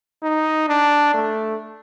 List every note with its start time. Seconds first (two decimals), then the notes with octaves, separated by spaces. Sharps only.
0.23 D#4
0.69 D4
1.14 A3